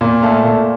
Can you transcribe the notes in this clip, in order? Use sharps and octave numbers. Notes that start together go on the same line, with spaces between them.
A#2
A3 F5 A5
A#2